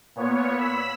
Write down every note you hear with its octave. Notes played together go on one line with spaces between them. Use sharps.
A#2 B3 C#5
B5 E6 B6